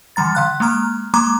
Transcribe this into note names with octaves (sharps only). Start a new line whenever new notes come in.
D3 E3 G3 A#5 A6
D3 F5 F#6
G#3 A#3 A#5 F6
G#3 A#3 A#5 D6